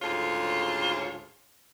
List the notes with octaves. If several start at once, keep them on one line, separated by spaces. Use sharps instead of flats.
D2 G#2 C#3 F4 A4 C#5